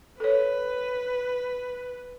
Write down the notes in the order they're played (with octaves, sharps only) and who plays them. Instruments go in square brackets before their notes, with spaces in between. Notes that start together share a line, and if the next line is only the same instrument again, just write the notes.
[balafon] A4 C#5 [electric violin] B4